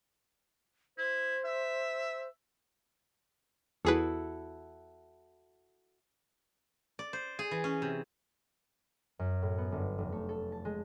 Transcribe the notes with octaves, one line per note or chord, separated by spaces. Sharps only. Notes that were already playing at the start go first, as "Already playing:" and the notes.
E4 C5
E5
E2 E4 F#4 G#4 A4 B4
D5
C5
G#4
E3
C#4
C3
F#2
A2
B3
G1
F1
A3
A4
A5
G#3